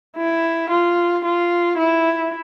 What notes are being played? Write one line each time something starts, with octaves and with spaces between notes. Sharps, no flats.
E4
F4
F4
E4